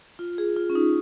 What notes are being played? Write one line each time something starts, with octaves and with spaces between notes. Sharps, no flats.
F4
G#4
F4
C#4
D#4